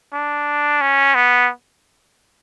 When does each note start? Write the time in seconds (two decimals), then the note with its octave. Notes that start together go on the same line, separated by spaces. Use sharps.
0.13 D4
0.81 C#4
1.15 B3